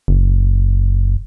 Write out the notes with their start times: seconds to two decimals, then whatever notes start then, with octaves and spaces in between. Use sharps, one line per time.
0.08 F#1